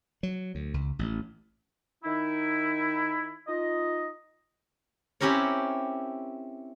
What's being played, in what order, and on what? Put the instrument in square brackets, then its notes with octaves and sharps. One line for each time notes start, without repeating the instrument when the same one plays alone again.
[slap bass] F#3
D2
C#2
A1
[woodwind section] D#3 D#4 E4
D#4 F4 D#5
[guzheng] C4 C#4 E4 G4 A#4 C#5